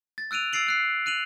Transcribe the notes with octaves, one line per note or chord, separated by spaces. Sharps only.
A6
E6 F#6 D7 D#7 F7
E6 A6 C7 D7 F#7
E6 F#6 C7
F#6 D#7 F7 F#7